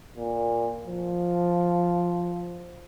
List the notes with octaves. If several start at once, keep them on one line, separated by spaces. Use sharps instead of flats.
A#2
F3